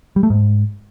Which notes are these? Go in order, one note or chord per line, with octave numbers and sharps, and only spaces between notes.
G3
A3
G#2